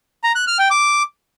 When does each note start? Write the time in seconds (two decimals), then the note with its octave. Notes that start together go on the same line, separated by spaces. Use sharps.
0.24 A#5
0.35 F#6
0.47 F6
0.59 G5
0.70 D6